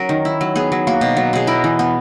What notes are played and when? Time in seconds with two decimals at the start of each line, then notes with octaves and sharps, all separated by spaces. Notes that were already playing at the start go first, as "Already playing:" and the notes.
Already playing: F#3 C#4 A#4 C#5
0.09 D#3
0.25 E4
0.41 F#3
0.56 B3 G#4
0.72 F#3
0.87 A#3 F#4
1.01 B2
1.17 F#3
1.33 B2 G#4
1.47 E4 A#4
1.64 E3
1.79 B3